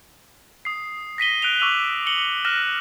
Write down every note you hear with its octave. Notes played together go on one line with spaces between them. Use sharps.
D#6 C7
A#6 B6 D#7 G7
F#6 D7 D#7 F7 G7
C#6 D6 E6 D#7 F7 F#7
C#7 F#7 G7
F6 F#6 A#6 D#7 E7